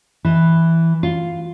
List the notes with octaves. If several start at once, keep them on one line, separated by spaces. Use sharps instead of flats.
E3
F4